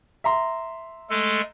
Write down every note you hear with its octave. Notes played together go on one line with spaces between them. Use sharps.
E5 A#5 C6
G#3 A3 A4